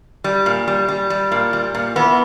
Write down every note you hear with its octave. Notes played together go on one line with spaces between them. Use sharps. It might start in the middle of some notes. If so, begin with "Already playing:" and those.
G3
A#2
G3
G3
G3
A#2
G3
A#2
E3 B3